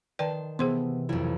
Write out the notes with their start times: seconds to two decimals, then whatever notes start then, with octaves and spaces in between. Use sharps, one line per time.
0.19 D#3 B4 D5 G5 A5 C6
0.59 C3 E3 B3 G#4 C5 C6
1.09 B1 F2 E4